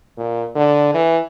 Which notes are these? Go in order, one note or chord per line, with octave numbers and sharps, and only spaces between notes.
A#2
D3
E3